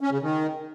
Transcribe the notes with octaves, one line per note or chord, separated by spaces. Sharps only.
C#4
C#3
D#3